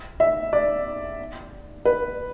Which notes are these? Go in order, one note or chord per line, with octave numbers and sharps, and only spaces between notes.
E5
D5
B4